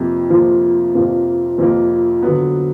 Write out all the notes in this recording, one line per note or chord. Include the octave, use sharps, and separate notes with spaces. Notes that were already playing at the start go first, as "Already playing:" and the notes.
Already playing: F2 C3 F3 A#3
F2 C3 F3 A#3
F2 C3 F3 A#3
F2 C3 F3 A#3
D3 F#3 B3